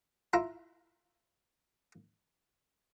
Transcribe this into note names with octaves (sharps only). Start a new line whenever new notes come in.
E4 F4 A#5